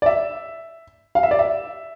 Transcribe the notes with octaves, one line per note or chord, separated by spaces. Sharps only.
D5
E5
F5
E5
D5
E5